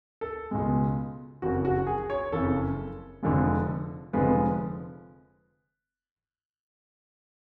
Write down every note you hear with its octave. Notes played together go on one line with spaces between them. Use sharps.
A4
C#2 B2 G#3
F#1 F2 C#3 F#4
F#4
G#4
C#5
F#1 F2 C#3 A4
F1 F2 D3 F3 G#3
F1 F2 D3 F3 G#3 B4